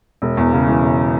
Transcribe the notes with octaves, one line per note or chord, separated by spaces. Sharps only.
E1
E2
C#3
E3
E1